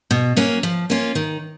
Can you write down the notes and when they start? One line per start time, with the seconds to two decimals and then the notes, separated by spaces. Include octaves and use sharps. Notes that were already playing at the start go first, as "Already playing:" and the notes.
0.11 B2
0.36 F#3 A#3 C#4 F#4
0.63 F3
0.90 A#3 C#4 F4
1.15 D#3